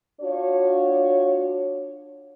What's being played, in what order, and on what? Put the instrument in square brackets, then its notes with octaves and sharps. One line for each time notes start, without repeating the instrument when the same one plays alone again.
[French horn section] D4 F4 F#4 C#5